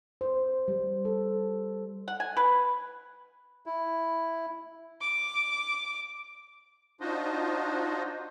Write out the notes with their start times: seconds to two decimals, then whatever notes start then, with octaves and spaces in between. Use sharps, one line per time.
0.21 C5
0.68 G3
1.05 A4
2.08 F#5
2.20 G#5
2.37 B4
3.66 E4
5.01 D6
7.01 D4 D#4 F4 F#4 C5 D#5